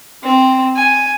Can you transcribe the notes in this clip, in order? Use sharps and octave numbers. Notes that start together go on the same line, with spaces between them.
C4
G#5